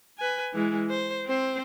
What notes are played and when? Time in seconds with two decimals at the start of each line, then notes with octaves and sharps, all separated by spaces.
0.18 B4 G#5
0.53 E3 G#3
0.89 C5
1.26 C4 C5